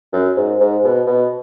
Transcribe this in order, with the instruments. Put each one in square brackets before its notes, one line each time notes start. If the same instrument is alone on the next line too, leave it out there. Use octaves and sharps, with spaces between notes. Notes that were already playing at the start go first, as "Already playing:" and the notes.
[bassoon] F#2
G#2
G#2
B2
B2